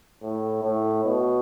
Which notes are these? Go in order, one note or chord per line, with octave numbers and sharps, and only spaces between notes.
A2
A2
B2